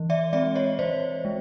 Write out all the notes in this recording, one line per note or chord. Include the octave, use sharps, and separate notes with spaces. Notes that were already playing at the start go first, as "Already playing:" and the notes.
Already playing: E3
D5 E5
G#3 C4 D5 E5
C#5 D#5
E3 C5 D5
G#3